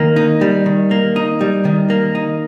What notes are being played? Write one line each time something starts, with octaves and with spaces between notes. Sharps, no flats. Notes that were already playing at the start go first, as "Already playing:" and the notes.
Already playing: D#3 A#3
D#4
G3
D#3
A#3
D#4
G3
D#3
A#3
D#4